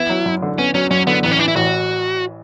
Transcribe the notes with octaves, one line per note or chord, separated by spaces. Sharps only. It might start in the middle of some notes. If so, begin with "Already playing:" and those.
Already playing: E3 B3 E4
F#3
F#2
D3
B3 C#4
F#3 C#4
F#2 C#4
D3 B3
A1 B3
C#4
E3 D4
E4
A1 F#4